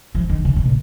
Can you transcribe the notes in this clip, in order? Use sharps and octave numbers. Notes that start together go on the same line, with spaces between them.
F3
D#3
C#3
C3
A#2